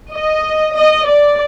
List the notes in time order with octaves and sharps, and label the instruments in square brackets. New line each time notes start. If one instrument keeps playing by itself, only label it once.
[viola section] D#5
D#5
D5